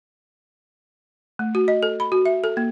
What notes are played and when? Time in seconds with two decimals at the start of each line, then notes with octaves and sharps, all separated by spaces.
1.39 A3
1.55 F#4
1.68 D#5
1.83 A4
2.00 B5
2.12 F#4
2.25 E5
2.44 A4
2.57 A#3